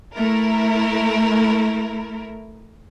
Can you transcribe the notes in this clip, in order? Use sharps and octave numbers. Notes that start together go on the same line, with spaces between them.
A3 E4 A#4